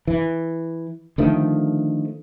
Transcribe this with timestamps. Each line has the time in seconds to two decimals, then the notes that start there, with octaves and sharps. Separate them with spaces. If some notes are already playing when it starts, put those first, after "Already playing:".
0.07 E3
1.18 D3 D#3 F3 A3